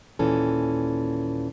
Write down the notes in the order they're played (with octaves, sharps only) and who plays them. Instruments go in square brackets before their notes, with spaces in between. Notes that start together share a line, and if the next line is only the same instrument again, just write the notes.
[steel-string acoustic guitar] D#2 A#2 E3 C#4 A4